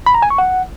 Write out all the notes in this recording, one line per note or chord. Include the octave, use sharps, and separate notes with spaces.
B5
A#5
G#5
C#6
F#5